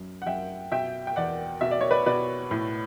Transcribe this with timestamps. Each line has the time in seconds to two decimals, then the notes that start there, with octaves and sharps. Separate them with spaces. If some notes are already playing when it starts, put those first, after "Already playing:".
Already playing: F#2
0.22 F#5
0.26 F#2 E5 G5
0.72 B2 E5 G5
1.07 G5
1.16 E2 D5 F#5
1.61 B2 E5
1.71 D5
1.81 C#5
1.91 B4 D5
2.06 B2 B4 D5
2.51 A2